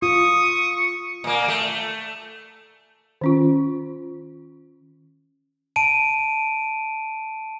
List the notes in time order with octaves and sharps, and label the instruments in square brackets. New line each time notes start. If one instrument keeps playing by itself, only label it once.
[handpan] F4 [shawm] C#6 [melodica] D#6
[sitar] A#2 A#3
A3
[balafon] D#3 C#4 F4
[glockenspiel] A5 D7 D#7